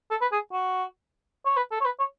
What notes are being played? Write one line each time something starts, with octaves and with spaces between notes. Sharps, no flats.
A4
B4
G#4
F#4
C#5
B4
A4
C#5
B4
C#5